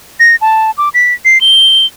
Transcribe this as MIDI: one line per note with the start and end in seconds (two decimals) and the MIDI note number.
0.20 0.36 94
0.41 0.71 81
0.78 0.89 86
0.94 1.14 95
1.25 1.41 96
1.41 1.86 103